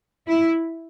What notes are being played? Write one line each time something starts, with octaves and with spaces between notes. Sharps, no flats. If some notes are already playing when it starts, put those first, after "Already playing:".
E4